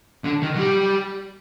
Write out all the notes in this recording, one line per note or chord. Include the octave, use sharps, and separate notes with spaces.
D3
D#3
F#3
G3